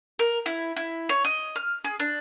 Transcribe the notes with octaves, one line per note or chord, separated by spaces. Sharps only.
A#4
E4
E4
C#5
D#5
F6
G#4
D4